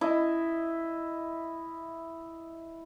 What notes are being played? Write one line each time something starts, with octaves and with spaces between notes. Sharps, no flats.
E4 D#5